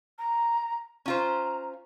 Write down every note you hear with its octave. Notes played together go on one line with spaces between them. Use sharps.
A#5
C#4 F4 C5 A#5